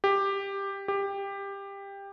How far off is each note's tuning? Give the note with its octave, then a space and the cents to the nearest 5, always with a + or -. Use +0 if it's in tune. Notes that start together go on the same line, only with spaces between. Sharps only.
G4 +10
G4 +15